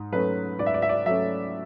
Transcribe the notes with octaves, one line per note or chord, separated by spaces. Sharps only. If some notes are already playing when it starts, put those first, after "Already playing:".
Already playing: G#2
F#3 A3 C#4 B4
G#2 D5
E5
D5
E5
D5
F#3 A3 C#4 E5